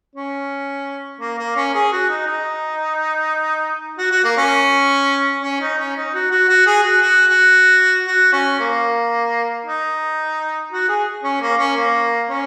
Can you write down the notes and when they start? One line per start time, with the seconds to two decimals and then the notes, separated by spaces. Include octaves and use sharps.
0.16 C#4
1.21 A#3
1.38 A#3
1.56 C#4
1.74 G#4
1.92 F#4
2.10 D#4
2.26 D#4
3.98 F#4
4.11 F#4
4.24 A#3
4.38 C#4
5.43 C#4
5.61 D#4
5.78 C#4
5.96 D#4
6.14 F#4
6.31 F#4
6.49 F#4
6.66 G#4
6.83 F#4
7.01 F#4
7.28 F#4
8.07 F#4
8.33 C#4
8.60 A#3
9.66 D#4
10.71 F#4
10.88 G#4
11.24 C#4
11.41 A#3
11.58 C#4
11.76 A#3
12.29 C#4